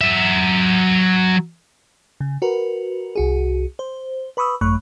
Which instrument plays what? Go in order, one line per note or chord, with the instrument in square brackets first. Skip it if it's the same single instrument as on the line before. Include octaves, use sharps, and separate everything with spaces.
[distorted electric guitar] F#3 E5
[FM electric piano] C#3
F#4 A#4 B4
C2 F#4 G#4
C5
B4 B5 C#6 D#6 E6
G#1 F#2 A3 B5 C#6 F#6